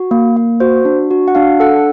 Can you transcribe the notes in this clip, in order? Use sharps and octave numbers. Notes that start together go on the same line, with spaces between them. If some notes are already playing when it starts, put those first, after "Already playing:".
Already playing: F#4
A#3
A#3
F#4 C5
D4
F#4
F#5
D4 F5
A4 F#5